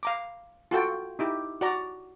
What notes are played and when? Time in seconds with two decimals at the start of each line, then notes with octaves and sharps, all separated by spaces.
0.03 F5 A#5 D6
0.71 F4 F#4 A4 G5
1.19 D#4 E4 G4
1.61 F#4 D5 A#5